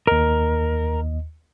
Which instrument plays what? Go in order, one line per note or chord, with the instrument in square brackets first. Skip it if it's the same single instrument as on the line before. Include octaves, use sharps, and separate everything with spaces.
[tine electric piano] D#2 D#5 [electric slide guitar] A#4